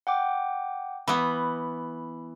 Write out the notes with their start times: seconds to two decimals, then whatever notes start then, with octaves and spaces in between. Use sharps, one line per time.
0.07 F#5 G5 D6
1.08 E3 B3 B5